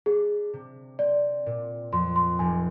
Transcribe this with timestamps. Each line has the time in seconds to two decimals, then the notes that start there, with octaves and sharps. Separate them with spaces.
0.06 D4 G#4
0.53 C3
0.99 C4 D5
1.46 A#2
1.92 F2 C6
2.16 C6
2.39 F1 G#5